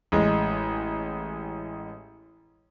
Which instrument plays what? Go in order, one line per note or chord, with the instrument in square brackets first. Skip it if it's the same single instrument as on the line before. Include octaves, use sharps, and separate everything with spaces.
[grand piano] A1 G#3